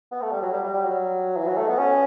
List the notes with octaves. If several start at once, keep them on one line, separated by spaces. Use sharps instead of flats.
B3
A3
G3
F#3
G3
G3
G3
F#3
E3
F#3
A3
B3
C#4